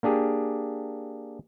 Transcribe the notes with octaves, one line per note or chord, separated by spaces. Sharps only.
A#3 D4 G4 G#4